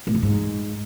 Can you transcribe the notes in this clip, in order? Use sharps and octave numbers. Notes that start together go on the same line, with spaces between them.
A2
E2
G#2